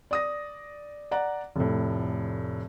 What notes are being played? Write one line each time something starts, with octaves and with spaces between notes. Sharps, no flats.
D5 D#6 A#6
D5 F#5 A#5
F1 A2